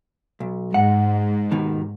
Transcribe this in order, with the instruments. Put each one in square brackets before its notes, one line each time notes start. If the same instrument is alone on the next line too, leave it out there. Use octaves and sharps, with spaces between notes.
[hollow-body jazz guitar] B1
[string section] G#2 [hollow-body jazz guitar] F#5
[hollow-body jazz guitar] D#2 B2 D#3